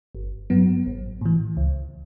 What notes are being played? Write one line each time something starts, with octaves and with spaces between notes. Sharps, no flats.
G1
G2 F#3 B3
A1
A2 E3
C#2